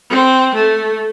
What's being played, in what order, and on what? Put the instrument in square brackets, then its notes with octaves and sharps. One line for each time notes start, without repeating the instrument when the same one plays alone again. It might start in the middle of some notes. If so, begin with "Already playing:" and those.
[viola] C4
A3